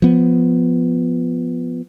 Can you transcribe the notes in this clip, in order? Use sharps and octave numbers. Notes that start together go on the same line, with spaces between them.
F3 B3